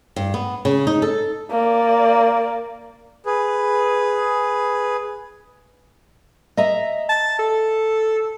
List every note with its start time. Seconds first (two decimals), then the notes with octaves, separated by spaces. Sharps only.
0.16 G2
0.34 B3
0.65 C#3
0.87 D#4
1.02 A4
1.51 A#3 D5
3.26 G#4 B4
6.57 D#5 E5 A#5
7.09 A5
7.39 A4